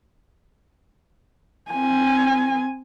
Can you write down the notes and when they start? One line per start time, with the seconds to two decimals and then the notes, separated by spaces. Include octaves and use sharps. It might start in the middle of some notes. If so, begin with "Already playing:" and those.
1.71 C4 G#5